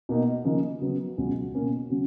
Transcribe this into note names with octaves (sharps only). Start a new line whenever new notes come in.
B2 A#3 D#4
C#3 F3 A#3 D#4
C#3 F#3 B3
C#2 B2 F#3 C#4
B2 A#3 C#4
C#3 F#3 C#4